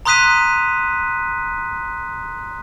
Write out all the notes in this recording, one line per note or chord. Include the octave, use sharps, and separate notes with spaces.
A#5 C6 D#6 F#6 B6 D#7